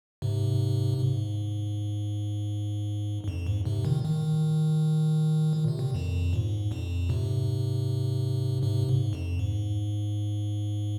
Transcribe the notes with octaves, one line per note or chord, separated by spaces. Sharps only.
G#2 C3
G#2
G#2
F2
G#2
G#2 C3
A#2 D#3
A#2 D#3
D#3
C3
A#2 D#3
F2 A#2
G#2
F2 A#2
G#2 C3
G#2 C3
G#2
F2
G#2